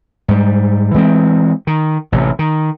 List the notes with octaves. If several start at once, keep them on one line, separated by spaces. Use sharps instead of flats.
G#2 G3
E3 G#3 A#3 C4
D#3
A1 C3
D#3